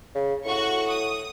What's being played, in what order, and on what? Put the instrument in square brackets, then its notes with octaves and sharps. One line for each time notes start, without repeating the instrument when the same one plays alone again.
[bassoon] C#3
[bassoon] A2 [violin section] F#4 C#6
[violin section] D#6